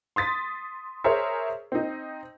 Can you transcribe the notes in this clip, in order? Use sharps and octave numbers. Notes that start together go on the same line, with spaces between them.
C6 D#6 A6 B6
G#4 A#4 C5 C#5 E5
C4 D#4